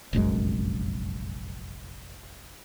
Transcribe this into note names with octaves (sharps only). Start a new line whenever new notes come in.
F1 A#1 F#2 G#3